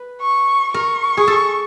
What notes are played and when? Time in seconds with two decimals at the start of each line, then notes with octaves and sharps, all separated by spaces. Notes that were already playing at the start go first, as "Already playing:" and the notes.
Already playing: B4
0.22 C#6
0.74 A#4 C#6
1.17 G#4
1.27 A4